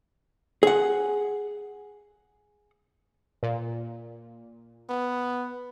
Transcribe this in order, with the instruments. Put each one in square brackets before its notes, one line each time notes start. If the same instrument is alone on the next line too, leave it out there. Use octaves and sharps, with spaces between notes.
[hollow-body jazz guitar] G#4 F#5
[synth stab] A#2
[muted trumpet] B3